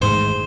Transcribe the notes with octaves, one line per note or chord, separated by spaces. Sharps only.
A1 G#2 D#3 G#3 C5